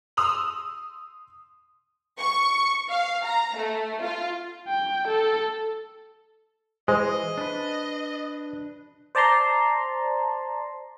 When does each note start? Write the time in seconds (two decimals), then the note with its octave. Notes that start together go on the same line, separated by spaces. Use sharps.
0.17 C6 D#6 E6 F7 F#7
2.19 C#6
2.90 F5
3.25 A#5
3.56 A3
4.02 F4
4.68 G5
5.08 A4
6.88 E3 G#3 G#4 C5 D#5 D#6
7.38 D4 B4
9.15 C5 D5 A5 A#5 C6